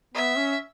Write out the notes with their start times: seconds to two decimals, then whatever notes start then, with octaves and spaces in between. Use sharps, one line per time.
0.15 B3 E5
0.37 C#4